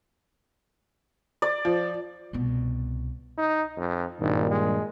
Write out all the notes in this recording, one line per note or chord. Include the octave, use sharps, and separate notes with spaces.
D5
F3
C2 B2
D#4
F2
G#1 G2 A#2 D#3
G#3